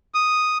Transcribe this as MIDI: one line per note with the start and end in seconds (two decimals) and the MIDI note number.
0.14 0.58 87